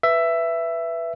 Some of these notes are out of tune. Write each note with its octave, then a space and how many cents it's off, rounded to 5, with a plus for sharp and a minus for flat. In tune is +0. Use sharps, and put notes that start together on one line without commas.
B4 +0 E5 +10